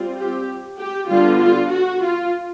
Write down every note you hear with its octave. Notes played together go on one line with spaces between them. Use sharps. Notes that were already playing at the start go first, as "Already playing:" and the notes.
Already playing: G3 C4 F4
G4
G4
D3 G3 B3 F4
F4
F#4
F4